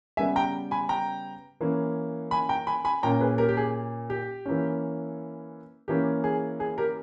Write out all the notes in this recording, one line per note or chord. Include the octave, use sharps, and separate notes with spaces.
C#3 G3 B3 E5 G#5
G5 A#5
G#5 B5
G5 A#5
E3 A#3 C#4
G#5 B5
G5 A#5
G#5 B5
G#5 B5
A#2 A#3 C#4 G5 A#5
G#4 B4
G4 A#4
G4
G#4
G4
E3 A#3 C#4
E3 A#3 C#4 G4
G#4
G#4
G4 A#4